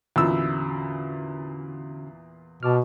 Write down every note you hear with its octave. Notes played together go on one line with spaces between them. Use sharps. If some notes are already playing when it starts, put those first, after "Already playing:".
E2 A#2 D3 C#4 F#4 E6
B2 A5 D6 F6